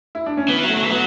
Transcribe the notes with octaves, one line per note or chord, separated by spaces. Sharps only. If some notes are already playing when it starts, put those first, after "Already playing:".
E4
D4
C#4
E3 B3
F#3
A3
F#3
E3
F#3 B3